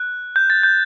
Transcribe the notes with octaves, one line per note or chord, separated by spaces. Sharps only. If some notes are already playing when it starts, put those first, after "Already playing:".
Already playing: F#6
G6
A6
G6